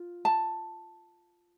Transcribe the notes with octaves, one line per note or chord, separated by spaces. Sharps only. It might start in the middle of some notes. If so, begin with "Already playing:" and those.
Already playing: F4
A5